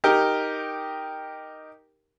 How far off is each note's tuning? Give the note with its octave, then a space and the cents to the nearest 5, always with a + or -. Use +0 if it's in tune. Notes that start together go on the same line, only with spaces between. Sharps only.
D#4 +0 G4 +0 A#4 +0